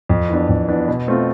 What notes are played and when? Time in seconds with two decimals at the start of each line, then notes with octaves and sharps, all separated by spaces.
0.09 F2
0.29 E3 B3 D4
0.49 F2
0.68 E3 B3 D4
0.88 B2
1.08 A3 C4 F4